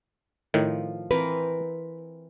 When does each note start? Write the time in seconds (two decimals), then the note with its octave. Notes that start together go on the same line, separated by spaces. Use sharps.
0.54 A2 D#3 F3
1.11 E3 C4 A#4 B4